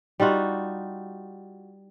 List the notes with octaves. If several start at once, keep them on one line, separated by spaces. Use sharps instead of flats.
G3 D#4 F4 F#4